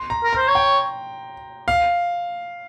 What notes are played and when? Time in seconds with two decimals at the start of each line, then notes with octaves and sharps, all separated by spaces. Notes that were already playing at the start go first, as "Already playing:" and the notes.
Already playing: C6
0.10 A#5
0.24 A#4
0.33 C5 A#5
0.48 C#5
0.55 G5
1.68 F5